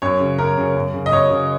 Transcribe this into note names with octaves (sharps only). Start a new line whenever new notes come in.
F#2 C#5
C#3
F#2 A#4
C#3
F#2
C#3
D#5
F#2 C#5
C#3